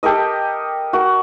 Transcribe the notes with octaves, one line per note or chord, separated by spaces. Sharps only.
G4 A4 A#4 D#5
F#4 A#4